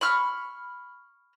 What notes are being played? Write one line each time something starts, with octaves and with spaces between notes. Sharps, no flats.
B5 C#6 F6